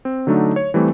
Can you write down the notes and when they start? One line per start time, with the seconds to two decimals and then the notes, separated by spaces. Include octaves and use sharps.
0.05 C4
0.27 D3 F#3 A3 D4 D#4
0.56 C#5
0.74 E3 G3 A3 C4